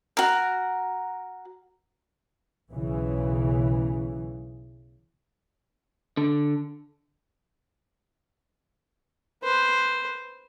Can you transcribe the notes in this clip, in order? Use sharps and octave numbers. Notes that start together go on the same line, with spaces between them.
F#4 A#4
B1 C#3 E3
D3
B4 C5